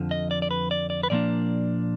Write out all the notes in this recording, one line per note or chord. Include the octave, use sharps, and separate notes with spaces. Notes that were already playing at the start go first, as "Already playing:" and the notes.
Already playing: F2 D3 F3
D#5
D5
D5
B4
D5
D5
B4
A#2 F3 A#3 D4 D5